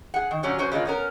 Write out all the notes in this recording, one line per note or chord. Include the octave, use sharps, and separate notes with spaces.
G#4 F#5
D#3
A#2 D3 F#3 C#4
F#3 C#4 F#4 B4 C5
C#3 G#3 A#3 F4
B3 C#4 A#4